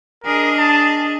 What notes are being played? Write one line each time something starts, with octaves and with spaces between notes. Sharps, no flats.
D4 G#4 A#4 D#5
A5